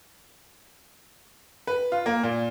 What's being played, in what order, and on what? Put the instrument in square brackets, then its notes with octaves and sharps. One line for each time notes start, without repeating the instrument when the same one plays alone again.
[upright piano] B4
F4
A#3
A#2